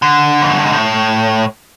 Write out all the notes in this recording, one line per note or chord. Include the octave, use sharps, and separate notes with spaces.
D3
F2
F#2
G2
G#2
A2